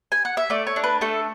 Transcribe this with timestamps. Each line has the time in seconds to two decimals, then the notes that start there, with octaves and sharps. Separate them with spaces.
0.12 G#5
0.25 F#5
0.37 E5
0.50 A3 D5
0.67 C#5
0.76 D4
0.84 B4
1.01 A3 A4